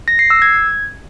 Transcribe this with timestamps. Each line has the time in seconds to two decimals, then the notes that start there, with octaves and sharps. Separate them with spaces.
0.08 A#6
0.19 C7
0.30 E6
0.42 G#6